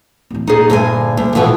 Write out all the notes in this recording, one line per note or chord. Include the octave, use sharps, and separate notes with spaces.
D1 E3
A#2 D#4 G#4
D2 G2 G#5
D2 A#2
A#1 F2 G#2 B2 E3